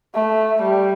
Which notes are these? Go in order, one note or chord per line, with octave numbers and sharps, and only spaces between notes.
A3
G3